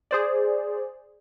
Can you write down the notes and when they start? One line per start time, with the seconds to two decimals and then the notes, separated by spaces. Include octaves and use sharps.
0.11 G#4 C5 D5